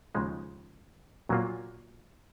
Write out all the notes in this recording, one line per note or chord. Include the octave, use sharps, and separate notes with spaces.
D#2 C#3 F3 G#3 D#4
A#2 F#3 A#3 F4